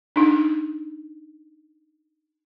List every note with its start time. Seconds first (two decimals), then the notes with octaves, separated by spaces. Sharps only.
0.16 D4 D#4